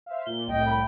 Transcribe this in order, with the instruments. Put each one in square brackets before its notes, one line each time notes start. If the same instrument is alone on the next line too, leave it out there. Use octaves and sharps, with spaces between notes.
[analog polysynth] C5 E5 F5
[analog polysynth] A#2 [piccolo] G7
[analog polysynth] C2 A2 [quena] D#5 [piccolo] G5
[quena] B5